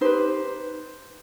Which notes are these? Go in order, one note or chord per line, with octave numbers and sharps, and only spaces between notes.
D#4 G4 B4 C5